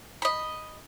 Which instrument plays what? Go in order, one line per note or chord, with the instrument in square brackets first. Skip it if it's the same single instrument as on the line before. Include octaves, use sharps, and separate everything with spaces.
[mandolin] D#5 B5